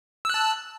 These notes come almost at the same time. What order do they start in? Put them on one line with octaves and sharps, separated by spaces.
E6 F#6 A5